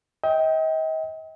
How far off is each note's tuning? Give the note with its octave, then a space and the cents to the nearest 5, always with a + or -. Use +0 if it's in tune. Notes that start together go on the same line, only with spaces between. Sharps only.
D#5 +40 G5 -5